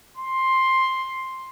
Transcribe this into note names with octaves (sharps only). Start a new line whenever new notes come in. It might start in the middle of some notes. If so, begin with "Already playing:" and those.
C6